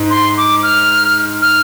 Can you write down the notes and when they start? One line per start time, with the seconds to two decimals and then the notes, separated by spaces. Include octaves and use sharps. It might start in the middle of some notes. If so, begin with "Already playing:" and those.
Already playing: G#2
0.10 C6
0.37 D6
0.63 F6
1.42 F6